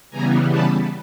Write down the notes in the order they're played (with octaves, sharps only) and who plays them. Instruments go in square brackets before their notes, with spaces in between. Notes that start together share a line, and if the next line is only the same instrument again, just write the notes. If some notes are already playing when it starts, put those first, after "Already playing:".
[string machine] C#3 E3 G3 B3 G#5 A#5
A5 B5